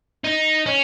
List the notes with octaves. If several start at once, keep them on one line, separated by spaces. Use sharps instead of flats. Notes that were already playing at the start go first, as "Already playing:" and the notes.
D#4
C#4